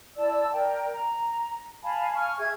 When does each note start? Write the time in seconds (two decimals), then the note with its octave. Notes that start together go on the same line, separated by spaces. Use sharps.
0.17 E4 D5 A5 E6
0.52 A#4 D5 G5
0.92 A#5
1.83 F5 G#5 A5 B5
2.14 G#5 C#6 F6
2.39 G#4 E5 G5 G#6